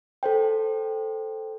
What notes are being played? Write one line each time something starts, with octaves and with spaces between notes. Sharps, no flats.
A4 C5 G5